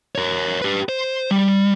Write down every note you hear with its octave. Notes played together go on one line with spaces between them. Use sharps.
A#4 C#5
G4 B4
C5
G3